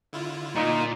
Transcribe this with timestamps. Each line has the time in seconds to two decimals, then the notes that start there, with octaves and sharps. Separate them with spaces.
0.13 D3 E4 F4
0.56 A#2 D#4